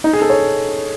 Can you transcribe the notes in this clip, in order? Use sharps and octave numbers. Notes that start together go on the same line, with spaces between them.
D#4
G#4
A4
C#5